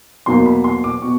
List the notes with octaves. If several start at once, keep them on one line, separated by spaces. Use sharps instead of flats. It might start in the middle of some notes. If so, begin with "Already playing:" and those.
E2 B2 F#3 A#3 D#4 C6
B5
C6
D6
B2 C#6